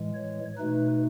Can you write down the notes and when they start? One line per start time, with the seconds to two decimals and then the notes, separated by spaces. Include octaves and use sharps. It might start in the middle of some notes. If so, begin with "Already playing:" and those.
Already playing: A2 E3 G#3
0.15 C#5
0.58 B2 A3 D#4 B4